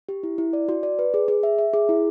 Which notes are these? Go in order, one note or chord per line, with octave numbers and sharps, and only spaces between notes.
G4
E4
E4
D5
F#4
D5
B4
G#4
G#4
E5
E5
G#4
E4